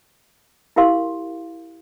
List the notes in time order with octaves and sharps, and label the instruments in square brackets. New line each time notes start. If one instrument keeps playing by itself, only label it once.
[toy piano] E4 G4 A#4 F5 C6